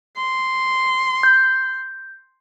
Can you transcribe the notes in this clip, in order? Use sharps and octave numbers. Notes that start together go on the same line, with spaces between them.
C6
G6